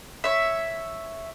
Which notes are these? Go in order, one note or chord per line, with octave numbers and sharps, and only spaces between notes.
C#5 E5